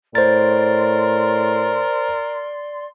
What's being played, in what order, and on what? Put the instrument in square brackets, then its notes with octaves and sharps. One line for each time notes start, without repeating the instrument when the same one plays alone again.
[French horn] A2 [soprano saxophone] A#4 [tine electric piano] C5 A6 [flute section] D5 C6